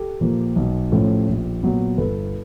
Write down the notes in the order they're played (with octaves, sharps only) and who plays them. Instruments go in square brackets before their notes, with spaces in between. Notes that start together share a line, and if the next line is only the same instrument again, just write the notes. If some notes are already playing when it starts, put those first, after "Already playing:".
Already playing: [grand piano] G4 A4
A#2 F3 A#3
B1
A2 F3 A3 C#4
A#1
A#2 F#3 B3
G1 A4 B4